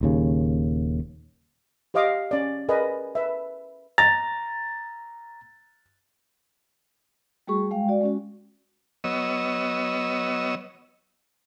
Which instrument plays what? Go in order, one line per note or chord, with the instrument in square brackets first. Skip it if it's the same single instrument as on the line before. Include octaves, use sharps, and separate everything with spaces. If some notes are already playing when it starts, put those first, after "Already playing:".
[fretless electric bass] D#1 D#2 C#3
[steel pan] G4 C5 D#5 F5 D6 D#6
C#4 D5
G#4 A#4 B4 D5 D#5 G#5
B4 E5
[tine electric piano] A#5 [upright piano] A6
[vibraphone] G3 A3 F#4 G#4 C#6
G#3 F5 G5
F#4 D5
G#3 C#4 F#4
[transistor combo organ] F#3 B3 C#5 D#5 E6